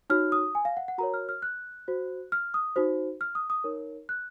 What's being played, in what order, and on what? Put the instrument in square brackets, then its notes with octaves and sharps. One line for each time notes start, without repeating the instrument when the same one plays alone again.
[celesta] D#4 F#4 C#5 F6
D#6
G#5
F5
F#5
F#5
F#4 A#4 C#5 A#5
F6
F6
F#6
F#4 C5
F6
D#6
D#4 F#4 C5
F6
D#6
D#6
D#4 A#4 C#5
F#6